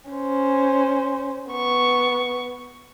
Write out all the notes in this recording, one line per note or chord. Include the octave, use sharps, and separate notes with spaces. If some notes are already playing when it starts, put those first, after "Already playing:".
C#4 C5
B3 C#6